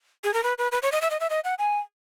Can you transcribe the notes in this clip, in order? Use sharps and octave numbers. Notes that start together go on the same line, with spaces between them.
G#4
A#4
B4
B4
B4
C#5
D#5
E5
D#5
E5
D#5
F#5
G#5